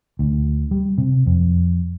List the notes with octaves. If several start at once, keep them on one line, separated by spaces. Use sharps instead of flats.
D2
G3
C3
F2